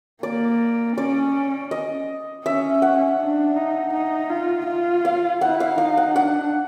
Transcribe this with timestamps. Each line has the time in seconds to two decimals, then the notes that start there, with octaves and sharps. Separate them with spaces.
0.23 A#3 D5
0.97 C#4 D5
1.71 D#5
2.45 C#4 E5
2.82 F#5
3.20 D4
3.56 D#4
3.94 D#4
4.30 F4
4.67 F4
5.05 F5
5.41 E4 F#5
5.60 F5
5.78 D#4 F5
5.97 F#5
6.15 D4 F#5